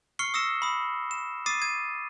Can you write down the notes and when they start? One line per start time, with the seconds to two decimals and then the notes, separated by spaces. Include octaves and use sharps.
0.19 C#6 F6 C7 C#7 G7
0.34 D#6 E6 A#6 C#7 E7
0.62 B5 D#6
1.11 E7
1.46 D6 D#6 A6 C7 D#7
1.62 G#6 D#7